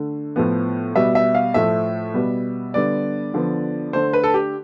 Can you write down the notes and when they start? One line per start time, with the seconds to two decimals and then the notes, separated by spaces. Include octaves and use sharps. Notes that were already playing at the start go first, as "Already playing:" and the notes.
Already playing: D3 A3
0.36 A2 F3 B3
0.95 B2 G3 B3 E5
1.15 E5
1.35 F5
1.54 A2 F3 A3 E5
2.14 B2 G3 B3
2.74 D3 G3 B3 D5
3.34 D3 F3 B3
3.93 D3 A3 C5
4.13 B4
4.24 A4
4.34 G4